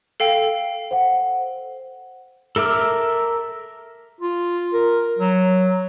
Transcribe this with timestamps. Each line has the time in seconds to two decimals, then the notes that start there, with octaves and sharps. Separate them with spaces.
0.20 A4 F5 G5
0.91 C5 F#5
2.56 A4 A#4 E5 D6 F6
4.21 F4
4.73 A#4
5.19 F#3